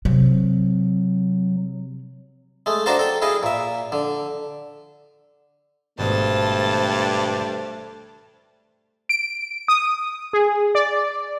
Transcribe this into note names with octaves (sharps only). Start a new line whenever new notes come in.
C3 F#3
G#3 A3
D4 F#4 A#4 C5 F5 A5
A4 G5
E4 G#4 D#5 F5
A#2 E5
D3
G#1 G2 B2 A3 C5 D#5 A5
D7
D#6
G#4
D5